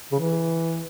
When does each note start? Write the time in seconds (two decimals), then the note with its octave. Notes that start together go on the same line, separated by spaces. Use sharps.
0.12 C#3
0.20 E3